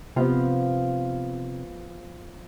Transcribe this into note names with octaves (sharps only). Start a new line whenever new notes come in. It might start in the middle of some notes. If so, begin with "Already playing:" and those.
C3 F3 B3 F4